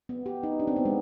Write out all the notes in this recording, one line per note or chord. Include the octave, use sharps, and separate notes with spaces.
B3
G4
D#4
D4
C4
B3
G#3